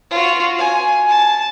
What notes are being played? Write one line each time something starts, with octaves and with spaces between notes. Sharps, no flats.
F4 F#4
G#5
A5